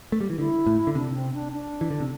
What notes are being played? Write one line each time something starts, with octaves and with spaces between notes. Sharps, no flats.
A3
G3
E3
D3 E4
A2
D3
C3 D4
C4
D4
D4
E3
D3
C3